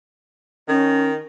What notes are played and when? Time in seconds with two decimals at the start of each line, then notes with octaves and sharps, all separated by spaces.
0.68 D#3 C#4